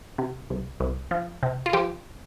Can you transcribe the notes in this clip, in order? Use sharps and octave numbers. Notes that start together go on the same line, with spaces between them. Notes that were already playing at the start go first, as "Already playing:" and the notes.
C3
C2
C2
F3
C3
F4
F3 G4